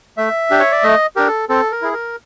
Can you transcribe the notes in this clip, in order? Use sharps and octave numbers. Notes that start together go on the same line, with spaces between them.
A3 E5
D4 G4
C#5
D5
A3 D#5
D4 G4 A#4
A4
C4 A4
A#4
E4 G#4
A#4